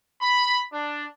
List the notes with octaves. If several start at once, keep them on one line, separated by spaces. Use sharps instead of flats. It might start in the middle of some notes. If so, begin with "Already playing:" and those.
B5
D4